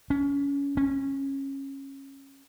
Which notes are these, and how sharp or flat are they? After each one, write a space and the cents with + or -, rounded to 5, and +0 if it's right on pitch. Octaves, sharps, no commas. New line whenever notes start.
C#4 +25
C#4 -20